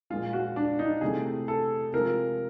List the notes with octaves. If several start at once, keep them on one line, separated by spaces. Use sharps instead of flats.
A#2 F3 G#3 F4
F#4
D4
D#4
C3 E3 A3 G#4
A4
C3 F3 G#3 A#4